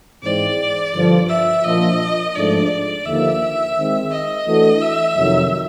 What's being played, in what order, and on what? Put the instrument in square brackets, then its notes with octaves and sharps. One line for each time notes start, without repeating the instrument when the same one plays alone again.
[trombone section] G#2 E3 G#3 C4 [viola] D5
[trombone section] G2 D3 F3
[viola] E5
[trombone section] A#2 F3 A#3 D4 F4 [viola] D#5
[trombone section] G#2 F3 A3 D4 [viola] D5
[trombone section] D#2 D3 F3 A#3 D#4 [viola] E5
[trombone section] D#3 G#3 C4
[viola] D#5
[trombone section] E3 A3 D4 F#4 A4
[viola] E5
[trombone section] F2 C3 D#3 F#3